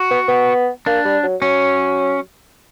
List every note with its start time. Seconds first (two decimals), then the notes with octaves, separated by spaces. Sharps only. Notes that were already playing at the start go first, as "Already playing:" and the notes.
Already playing: F#4
0.11 B3
0.28 B3
0.86 A#3 D4
1.05 G3
1.23 F#3
1.42 F#3 C#4